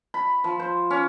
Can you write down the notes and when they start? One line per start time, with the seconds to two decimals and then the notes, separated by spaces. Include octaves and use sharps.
0.14 B5
0.44 F3
0.60 C5
0.90 C#4